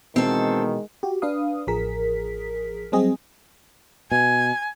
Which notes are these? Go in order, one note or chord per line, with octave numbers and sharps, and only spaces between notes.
B2 D#3 E3 G#3 C4 A4
F#4 G4
D4 B4 F5 D#6
A1 F3 G#4 A#4 B6
F#3 G3 C4 G#4 D#5
B2 G#5